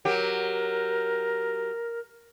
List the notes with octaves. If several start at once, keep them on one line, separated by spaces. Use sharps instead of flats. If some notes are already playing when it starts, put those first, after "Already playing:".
F#3 G4 A#4